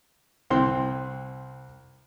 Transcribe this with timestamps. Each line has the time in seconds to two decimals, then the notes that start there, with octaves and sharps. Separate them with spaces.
0.50 C2 C4 C6